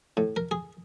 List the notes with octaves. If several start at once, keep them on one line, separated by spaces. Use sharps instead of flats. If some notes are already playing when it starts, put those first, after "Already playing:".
A2
A#4
G#4